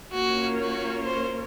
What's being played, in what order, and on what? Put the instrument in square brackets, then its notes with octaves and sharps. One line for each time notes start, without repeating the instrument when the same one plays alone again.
[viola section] A#3 C#4 F4 A#4 C#5 [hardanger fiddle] F#4
[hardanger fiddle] F#4
C5